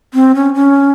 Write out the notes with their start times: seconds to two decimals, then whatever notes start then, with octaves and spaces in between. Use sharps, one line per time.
0.14 C4
0.35 C#4
0.54 C#4